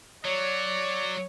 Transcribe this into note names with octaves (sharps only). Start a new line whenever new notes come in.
F#3 C#5 D5